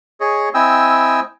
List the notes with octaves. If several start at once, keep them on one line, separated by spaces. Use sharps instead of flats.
G#4 C#5 D#5
C4 E4 D#5 G5 G#5 E6